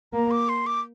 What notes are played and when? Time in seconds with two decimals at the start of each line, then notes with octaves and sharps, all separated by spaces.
0.13 A#3 A#5
0.31 D6
0.49 C6
0.66 D6